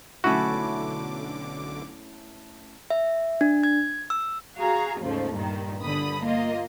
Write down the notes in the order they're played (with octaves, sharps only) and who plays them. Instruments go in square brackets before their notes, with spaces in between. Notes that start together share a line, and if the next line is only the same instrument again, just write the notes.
[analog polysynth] B1 D3 D6 [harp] A3 C#4 E4 [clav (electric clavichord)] F#4
[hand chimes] E5
D4
G#6
E6
[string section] F#4 G#4 F5 A#5
D#2 G#2 C#3 F3 A3
G2 A#2 D#3
G1 D3 B5 D#6
A#3 F4 D#5